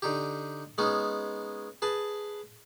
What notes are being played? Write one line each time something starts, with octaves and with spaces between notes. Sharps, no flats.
D3 D#4 G4
G#3 B3 C#4 D#4
G#4 B4 A5